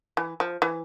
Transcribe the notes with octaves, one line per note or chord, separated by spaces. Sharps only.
E3
F3
E3